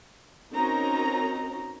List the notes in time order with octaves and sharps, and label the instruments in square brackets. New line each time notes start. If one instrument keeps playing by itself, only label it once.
[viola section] C4 C#4 D#4 F#4 A#4 A#5